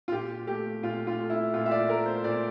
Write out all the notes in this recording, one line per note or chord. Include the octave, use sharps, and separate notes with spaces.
F4
A#2 G4
A3 G4
A#2 F4
F4
A3
E4
A#2 F4
E5
D5
A3 A#4
C5
A#2 D5